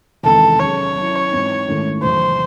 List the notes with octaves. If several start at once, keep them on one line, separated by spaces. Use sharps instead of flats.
E2 C3 D#3 G#3 C4 A4
F#3 C#4 G#4 C#5
F#3 C#4 E4
G#2 E3 C4 D#4
G#2 D#3 A3 C#4 E4
E2 C3 F#3 C5